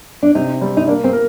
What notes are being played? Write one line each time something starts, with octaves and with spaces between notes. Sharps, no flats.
D4
C3 D#4
G3 C4
D#4
A#3 D4
C4
A#4